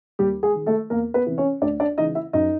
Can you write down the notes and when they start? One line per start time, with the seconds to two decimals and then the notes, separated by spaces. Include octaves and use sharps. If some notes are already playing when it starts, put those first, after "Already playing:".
0.19 D#2 G3 G4
0.43 G#3 G#4
0.55 D#3 G#3
0.66 A3 A4
0.90 E2 A#3 A#4
1.14 B3 B4
1.26 C3 E3
1.38 C#4 C#5
1.62 D2 D4 D5
1.80 D4 D5
1.98 C#3 E3 G#3 D#4 D#5
2.15 E4 E5
2.33 F#2 D#4 D#5